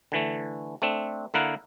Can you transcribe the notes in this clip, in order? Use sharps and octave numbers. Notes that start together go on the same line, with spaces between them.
D3 E3 A3
A3 C4 D4
D3 A#3 E4 A#4 F#5